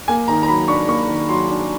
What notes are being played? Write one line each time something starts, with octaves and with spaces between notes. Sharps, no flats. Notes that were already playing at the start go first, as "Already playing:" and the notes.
A#3 G#5
D#3 A#5
A#5
F#3 B5
D4 C#6
A#3 C#6
D#3
F#3 C6
D4